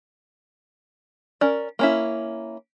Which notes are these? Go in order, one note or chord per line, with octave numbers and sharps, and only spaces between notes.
C#4 A#4 D5
A#3 C#4 E4